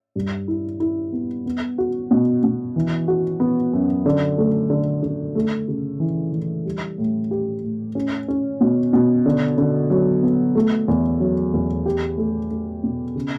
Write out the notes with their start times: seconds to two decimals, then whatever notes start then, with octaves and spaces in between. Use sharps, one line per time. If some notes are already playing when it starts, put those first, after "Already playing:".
0.15 G2
0.48 E4
0.80 E4
1.13 B3
1.46 B3
1.78 F#4
2.11 B2
2.43 B2
2.76 E3
3.08 F#4
3.40 B3
3.73 F#2
4.06 D3
4.38 A3
4.70 D3
5.03 D3
5.35 A3
5.68 C#3
6.00 E3
6.32 E3
6.65 G3
6.98 A2
7.31 G4
7.63 A2
7.95 C#4
8.28 C#4
8.61 B2
8.93 B2
9.26 D3
9.58 D3
9.90 F#3
10.23 B3
10.55 A3
10.88 E2
11.20 F#3
11.54 E2
11.86 G4
12.18 A3
12.51 A3
12.83 B2
13.16 C#3